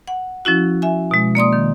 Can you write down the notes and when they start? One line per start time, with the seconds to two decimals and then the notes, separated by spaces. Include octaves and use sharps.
0.08 F#5
0.45 F3 C#4 E4 F#4
0.82 E5 G#5
1.11 B2 G#3
1.35 A#3 D5 C6 D#6
1.53 D#3